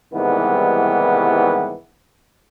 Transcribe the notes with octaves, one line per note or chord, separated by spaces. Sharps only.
C2 G#2 D#3 E3 G3 B3